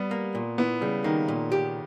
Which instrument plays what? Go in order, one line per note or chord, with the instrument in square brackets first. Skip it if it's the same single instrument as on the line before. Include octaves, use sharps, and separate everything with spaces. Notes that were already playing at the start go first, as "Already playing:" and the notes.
Already playing: [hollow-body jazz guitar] G3 [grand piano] B3
[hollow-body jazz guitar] A#3
A#2
[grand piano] B3 [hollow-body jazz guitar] E4
[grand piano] C#3 [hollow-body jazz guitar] G3
[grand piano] D#3 [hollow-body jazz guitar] A#3
[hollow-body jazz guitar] A#2
G4